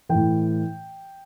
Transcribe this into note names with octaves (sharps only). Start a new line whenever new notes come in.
E3 G5
A2